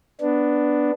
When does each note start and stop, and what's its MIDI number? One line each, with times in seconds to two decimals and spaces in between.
0.21 0.91 59
0.21 0.91 62